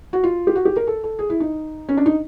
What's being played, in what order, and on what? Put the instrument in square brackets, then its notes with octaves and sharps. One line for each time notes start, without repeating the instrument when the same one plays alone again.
[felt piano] F#4
F4
G4
F#4
G4
A#4
A4
A4
G#4
E4
D#4
C#4
D4
D#4